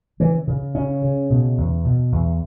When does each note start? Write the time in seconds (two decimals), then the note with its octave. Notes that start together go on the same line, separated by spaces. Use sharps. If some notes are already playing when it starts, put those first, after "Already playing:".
0.20 C#3 E3
0.47 C#3
0.75 C#3 C#4
1.02 C#3
1.30 B2
1.58 E2
1.85 B2
2.12 E2